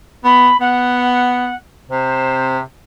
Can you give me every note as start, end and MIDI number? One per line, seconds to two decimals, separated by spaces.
0.24 0.50 59
0.24 0.56 83
0.60 1.51 59
0.60 1.55 78
1.89 2.61 48
1.89 2.56 72